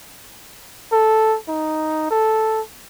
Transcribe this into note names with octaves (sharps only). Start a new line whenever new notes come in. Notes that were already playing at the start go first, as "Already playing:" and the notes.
A4
D#4
A4